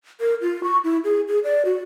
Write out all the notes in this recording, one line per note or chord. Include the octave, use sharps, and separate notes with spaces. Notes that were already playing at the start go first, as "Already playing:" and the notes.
A#4
F4
C#6
E4
G#4
G#4
D5
F#4